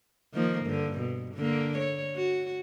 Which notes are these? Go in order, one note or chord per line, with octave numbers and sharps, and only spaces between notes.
D#3 F3 A#3
G2 D3
B2
D3 A#3
C#5
F#4